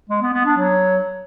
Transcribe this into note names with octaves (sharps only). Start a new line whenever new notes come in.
G#3
B3
B3
D4
F#3